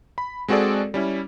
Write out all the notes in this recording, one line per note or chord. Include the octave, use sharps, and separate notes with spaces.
B5
G#3 C4 F#4 G#4 A4 D5
G3 C#4 E4